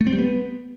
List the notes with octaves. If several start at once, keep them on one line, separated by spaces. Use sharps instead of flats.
A3
C4
G3
B3